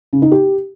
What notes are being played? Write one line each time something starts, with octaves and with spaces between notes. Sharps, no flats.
C#3
D#4
G4